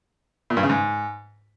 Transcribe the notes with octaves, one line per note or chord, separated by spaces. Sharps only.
A#2
G2
C#3
G#2